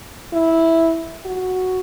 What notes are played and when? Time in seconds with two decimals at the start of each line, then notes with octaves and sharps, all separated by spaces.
0.33 E4
1.25 F#4